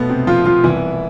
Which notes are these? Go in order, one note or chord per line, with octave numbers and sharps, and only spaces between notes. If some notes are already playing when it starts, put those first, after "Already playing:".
Already playing: B2 F3 A3 B3
C3 C4
F3 F4
F3 F4
C2 B2 E3 E4